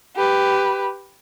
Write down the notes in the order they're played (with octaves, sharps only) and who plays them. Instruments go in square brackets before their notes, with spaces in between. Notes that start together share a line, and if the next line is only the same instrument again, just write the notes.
[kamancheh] G4 B4